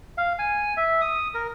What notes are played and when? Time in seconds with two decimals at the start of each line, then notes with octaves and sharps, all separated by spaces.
0.18 F5
0.39 G#5
0.77 E5
1.01 D#6
1.34 A#4